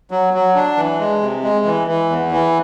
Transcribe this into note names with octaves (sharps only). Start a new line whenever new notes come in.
F#3
F#3
D4
E3
G#3
C3
G#3
E3
E3
E2
E3